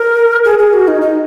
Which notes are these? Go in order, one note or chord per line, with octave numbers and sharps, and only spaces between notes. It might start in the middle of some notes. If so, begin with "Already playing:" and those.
Already playing: A#4
G#4
G#4
F#4
D#4
D#4